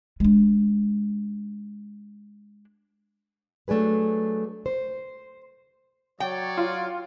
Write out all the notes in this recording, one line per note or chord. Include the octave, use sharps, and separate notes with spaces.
G#3 D4
F#3 A3 D4 G#4 B4
C5
F#3 C#5 D5 G5
F4